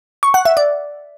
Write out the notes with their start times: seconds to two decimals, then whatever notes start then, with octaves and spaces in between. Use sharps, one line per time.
0.23 C#6
0.34 F#5
0.45 E5
0.57 D5